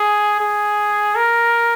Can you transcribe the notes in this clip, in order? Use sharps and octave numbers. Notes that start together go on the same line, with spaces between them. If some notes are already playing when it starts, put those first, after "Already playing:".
Already playing: G#4
G#4
A#4